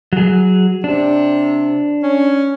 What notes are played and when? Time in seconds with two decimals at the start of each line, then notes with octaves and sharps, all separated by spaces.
0.13 F#3 G#4
0.84 C3 D4
2.03 C#4